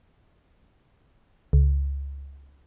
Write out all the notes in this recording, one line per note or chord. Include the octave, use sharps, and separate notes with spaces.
C#2